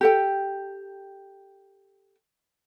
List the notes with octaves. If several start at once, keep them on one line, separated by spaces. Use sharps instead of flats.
G4 A4 G5